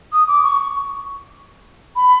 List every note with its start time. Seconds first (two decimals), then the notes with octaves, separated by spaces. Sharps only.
0.13 D#6
0.28 D6
0.43 C#6
1.96 B5